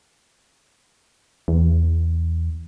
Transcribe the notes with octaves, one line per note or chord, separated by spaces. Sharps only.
E2